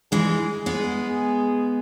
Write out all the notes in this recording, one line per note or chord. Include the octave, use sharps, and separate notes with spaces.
E3 G#3 G#4
G#3 B3